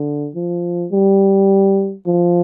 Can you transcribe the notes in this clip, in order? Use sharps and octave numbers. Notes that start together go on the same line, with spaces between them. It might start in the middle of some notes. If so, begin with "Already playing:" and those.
Already playing: D3
F3
G3
F3